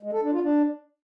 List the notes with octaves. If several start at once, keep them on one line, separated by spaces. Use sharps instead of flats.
G#3
A4
D4
F4
D4